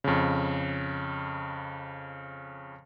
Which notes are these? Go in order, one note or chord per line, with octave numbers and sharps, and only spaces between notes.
F2 C#3